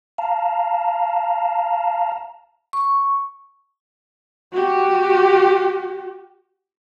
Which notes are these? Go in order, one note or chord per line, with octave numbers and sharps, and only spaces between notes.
F5 A5 A#5
C#6
F#4 G4